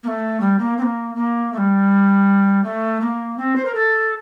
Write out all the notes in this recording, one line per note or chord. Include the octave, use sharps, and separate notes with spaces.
A#3
A3
G3
A#3
C4
A#3
A#3
A3
G3
A3
A#3
C4
C5
A#4
A4